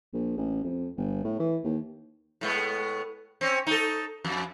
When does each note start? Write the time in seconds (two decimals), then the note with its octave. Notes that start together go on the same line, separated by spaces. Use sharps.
0.13 A#1
0.37 A1
0.64 F2
0.97 G1
1.24 A2
1.39 E3
1.64 D#2
2.41 A2 G#3 B3
3.41 C4 C#4
3.67 D#4 A4
4.25 F2